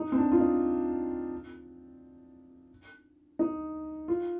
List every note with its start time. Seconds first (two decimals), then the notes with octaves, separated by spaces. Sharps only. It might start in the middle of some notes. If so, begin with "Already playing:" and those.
Already playing: D#4
0.12 C4
0.18 D4
0.32 F4
0.40 D#4
3.39 D#4
4.08 F4